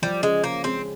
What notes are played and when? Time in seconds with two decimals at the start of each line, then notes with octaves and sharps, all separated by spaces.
0.02 F3 G3
0.23 C#3 G#3
0.44 A#3 C#4
0.64 G#3 C4